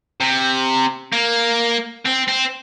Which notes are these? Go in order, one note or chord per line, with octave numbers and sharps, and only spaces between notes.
C3
A#3
C4
C4